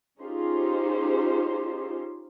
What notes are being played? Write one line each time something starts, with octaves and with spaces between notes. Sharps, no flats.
C#4 D#4 F4 G4 G#4 C5